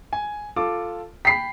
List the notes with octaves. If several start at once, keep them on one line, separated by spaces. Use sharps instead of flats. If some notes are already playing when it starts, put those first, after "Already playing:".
G#5
F4 A4 D6
G5 B5 B6 C7